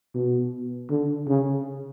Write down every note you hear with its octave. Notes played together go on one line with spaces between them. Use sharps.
B2
D3
C#3